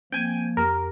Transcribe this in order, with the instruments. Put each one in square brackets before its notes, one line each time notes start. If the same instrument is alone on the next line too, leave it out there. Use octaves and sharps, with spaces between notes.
[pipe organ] F3 A#3 [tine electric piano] C4 [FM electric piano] G5 G#5
[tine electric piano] F2 G4 [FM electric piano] A#4